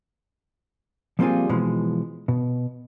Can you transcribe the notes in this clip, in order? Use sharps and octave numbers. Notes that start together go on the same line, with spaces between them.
F3 G3 A#3 C4 F4 G#4
B2 E3 F3 G#3
B2